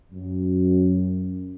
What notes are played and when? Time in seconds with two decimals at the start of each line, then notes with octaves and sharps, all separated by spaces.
0.12 F#2